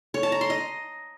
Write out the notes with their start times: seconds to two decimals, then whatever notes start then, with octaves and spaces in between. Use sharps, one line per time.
0.14 C#5
0.23 A5
0.32 A#5
0.41 C6
0.50 D#5